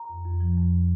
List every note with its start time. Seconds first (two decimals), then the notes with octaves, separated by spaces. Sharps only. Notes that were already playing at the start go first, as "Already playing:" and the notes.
Already playing: A#5
0.09 F2
0.25 F2
0.40 F3
0.57 F2